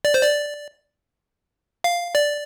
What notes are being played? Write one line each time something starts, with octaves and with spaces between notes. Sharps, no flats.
D5
C5
D5
F5
D5